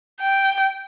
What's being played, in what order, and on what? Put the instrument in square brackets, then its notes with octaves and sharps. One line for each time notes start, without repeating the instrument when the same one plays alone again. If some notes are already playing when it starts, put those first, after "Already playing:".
[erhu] G5